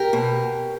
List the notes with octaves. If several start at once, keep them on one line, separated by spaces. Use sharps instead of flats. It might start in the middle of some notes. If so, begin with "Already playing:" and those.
Already playing: G4 A#4
B2